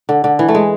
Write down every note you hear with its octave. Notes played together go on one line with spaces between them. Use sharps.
D3
D3
E3
A3
G#3